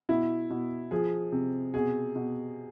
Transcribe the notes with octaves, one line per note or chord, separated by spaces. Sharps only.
B2 E4
B2
F3 G#4
C3
B2 G#4
B2